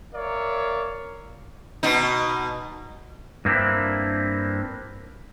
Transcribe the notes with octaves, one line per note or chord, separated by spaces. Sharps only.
A#4 C#5 D5 E5 F5
B2 D#4
G2 A#3 C4 D4 E4